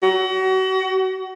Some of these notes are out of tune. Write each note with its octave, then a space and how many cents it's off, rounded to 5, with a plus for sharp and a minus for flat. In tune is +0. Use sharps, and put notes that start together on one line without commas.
F#4 +35